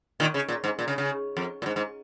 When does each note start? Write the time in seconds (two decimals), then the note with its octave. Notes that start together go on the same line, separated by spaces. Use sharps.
0.20 A#2 D#3
0.34 C#3
0.49 A#2
0.64 G#2
0.79 A#2
0.88 C#3
0.98 C#3
1.37 F2
1.62 A#2
1.66 G#2
1.76 G#2